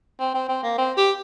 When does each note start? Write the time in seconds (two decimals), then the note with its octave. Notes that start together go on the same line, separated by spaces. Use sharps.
0.20 C4
0.34 C4
0.49 C4
0.63 A#3
0.78 C4
0.97 G4